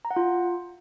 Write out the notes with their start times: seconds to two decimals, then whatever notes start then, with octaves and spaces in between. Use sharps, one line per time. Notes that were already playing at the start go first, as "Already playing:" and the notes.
0.05 A#5
0.11 F#5
0.16 F4